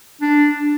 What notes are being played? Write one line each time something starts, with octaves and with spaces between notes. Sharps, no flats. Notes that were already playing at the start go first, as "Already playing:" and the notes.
D4